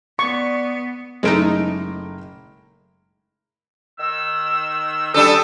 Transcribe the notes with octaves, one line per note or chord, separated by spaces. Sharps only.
B3 D5 C#6
F#1 G#3 A3 D#4 A#4 D7
D#3 E6
G3 C#4 D4 A4 D#6 E6